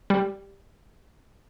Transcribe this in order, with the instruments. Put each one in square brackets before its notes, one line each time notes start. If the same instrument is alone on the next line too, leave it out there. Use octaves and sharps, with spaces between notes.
[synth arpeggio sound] G3